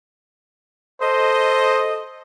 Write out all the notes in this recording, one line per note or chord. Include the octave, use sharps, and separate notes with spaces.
A4 C5 D#5